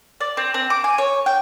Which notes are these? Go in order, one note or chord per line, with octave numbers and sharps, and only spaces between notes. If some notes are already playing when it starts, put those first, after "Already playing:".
D5
C4
C4
D6
G#5
C#5
G5